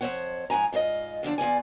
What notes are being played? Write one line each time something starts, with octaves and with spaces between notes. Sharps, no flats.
F2 F#3 C5 C#5 F#5
G#2 F3 G#5 A#5
G#2 F4 C5 D#5
G2 D3 F3 D4
E2 F4 D5 G#5